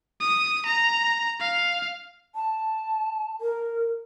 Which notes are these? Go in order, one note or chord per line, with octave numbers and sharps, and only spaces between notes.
D#6
A#5
F5
A5
A#4